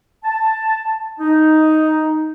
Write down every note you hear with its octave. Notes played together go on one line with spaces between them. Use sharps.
A5
D#4